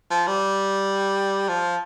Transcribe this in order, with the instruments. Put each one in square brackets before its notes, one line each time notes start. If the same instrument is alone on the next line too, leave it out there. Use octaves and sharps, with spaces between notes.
[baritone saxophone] F3
G3
F3